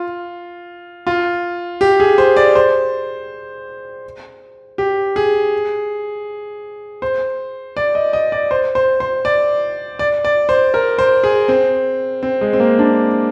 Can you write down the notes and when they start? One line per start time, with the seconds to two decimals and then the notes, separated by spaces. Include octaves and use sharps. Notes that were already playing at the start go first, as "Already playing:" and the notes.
Already playing: F4
1.07 F4
1.81 G4
2.00 G#4
2.18 C5
2.37 D5
2.56 C5
4.78 G4
5.16 G#4
7.02 C5
7.77 D5
7.95 D#5
8.13 D#5
8.32 D5
8.51 C5
8.75 C5
9.00 C5
9.25 D5
9.99 D5
10.25 D5
10.49 C5
10.74 A#4
10.99 C5
11.24 G#4
11.48 C4
12.23 C4
12.41 G#3
12.53 C4
12.60 A#3
12.79 D4